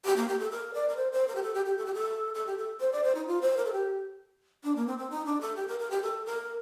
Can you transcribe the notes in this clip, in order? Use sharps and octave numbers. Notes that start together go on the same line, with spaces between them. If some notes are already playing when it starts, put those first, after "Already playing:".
G4
A#3
G4
A4
A#4
D5
A#4
C5
C5
A#4
G4
A4
G4
G4
A4
G4
A4
A4
G4
A4
C5
D5
C5
D#4
F4
C5
A#4
A4
G4
D4
A#3
C4
C4
D#4
D4
A4
G4
A#4
A#4
G4
A4
A#4